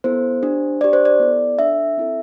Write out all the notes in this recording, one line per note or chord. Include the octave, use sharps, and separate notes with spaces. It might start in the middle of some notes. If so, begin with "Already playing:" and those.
B3 E4 A4 C5
D4 G4
D4 G4 D5
C5
D5
B3 E4 A4
D4 A4 E5
C4 E4 A4